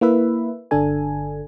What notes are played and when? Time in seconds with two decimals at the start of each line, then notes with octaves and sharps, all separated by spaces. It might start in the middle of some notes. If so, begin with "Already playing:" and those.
0.01 A#3 E4 B4 E5
0.71 G1 D3 D4 A4 G#5